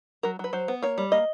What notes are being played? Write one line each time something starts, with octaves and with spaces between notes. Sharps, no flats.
F#3 A#4
F#3 B4
F#3 C5
B3
A#3 C#5
G3
A#3 D#5